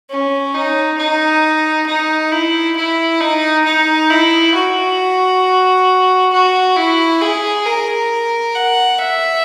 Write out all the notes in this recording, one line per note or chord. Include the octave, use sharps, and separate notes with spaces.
C#4
D#4
D#4
D#4
E4
E4
D#4
D#4
E4
F#4
F#4
E4
G#4
A#4
F#5
E5